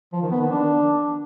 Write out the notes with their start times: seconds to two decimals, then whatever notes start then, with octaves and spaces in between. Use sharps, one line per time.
0.13 F3
0.22 D#3
0.31 B3
0.41 D#3
0.50 D4